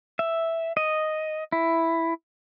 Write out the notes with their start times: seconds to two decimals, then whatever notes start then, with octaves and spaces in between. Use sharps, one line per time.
0.19 E5
0.77 D#5
1.52 E4